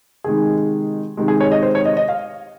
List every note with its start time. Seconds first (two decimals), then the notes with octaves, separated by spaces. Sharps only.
0.24 C3 D#3 G#3 G#4
1.17 C3 D#3 G#3
1.28 G#4
1.40 C#5
1.52 D#5
1.62 C5
1.75 C#5
1.85 D#5
1.97 D#5
2.08 F5